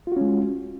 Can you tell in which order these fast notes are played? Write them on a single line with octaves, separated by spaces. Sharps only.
F4 F#4 C#4 G#3